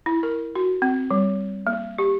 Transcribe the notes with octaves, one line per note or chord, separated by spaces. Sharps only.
E4
A#4
F#4
C4
G3
A#3
G4